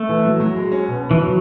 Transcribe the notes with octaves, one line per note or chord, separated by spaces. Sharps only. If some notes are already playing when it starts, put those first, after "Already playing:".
Already playing: A3
E3
F#3
F#3
G#3
C#4
B2
B3
E3
F#3